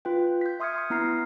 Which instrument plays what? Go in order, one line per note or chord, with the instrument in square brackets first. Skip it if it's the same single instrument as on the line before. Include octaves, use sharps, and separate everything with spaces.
[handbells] F4 B4 G5
G6 B6
E5 C6 D#6 F6 G#6 C#7
C6 D#6
B3 E4 A#5 F6 C7